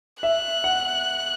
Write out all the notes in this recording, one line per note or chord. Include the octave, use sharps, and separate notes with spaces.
E5 F#6
F#5